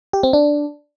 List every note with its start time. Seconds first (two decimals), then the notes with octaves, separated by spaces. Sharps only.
0.13 G4
0.23 C4
0.33 D4